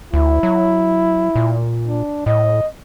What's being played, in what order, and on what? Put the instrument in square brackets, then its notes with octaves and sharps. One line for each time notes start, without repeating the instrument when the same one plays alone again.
[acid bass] D2 [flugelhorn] E4
[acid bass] F#3
A#2
[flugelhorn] D4
[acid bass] A2 [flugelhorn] D#5